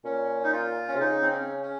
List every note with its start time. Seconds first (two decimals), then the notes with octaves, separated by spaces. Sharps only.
0.04 A#2 C#4
0.44 D#4
0.52 F4
0.88 C#4
0.94 C3
0.99 C#3 D#4
1.22 C4
1.31 C#4
1.62 C#4